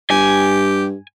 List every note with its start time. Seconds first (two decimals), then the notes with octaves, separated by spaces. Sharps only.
0.10 G2 G4 G#5